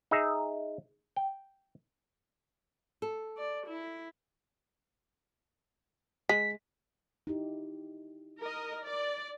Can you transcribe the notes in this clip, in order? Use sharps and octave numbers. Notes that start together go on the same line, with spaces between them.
D#4 G#4 E5 A#5
G5
A4
D5
E4
G#3 B6
D#4 E4 G4
A#4 D#5
D5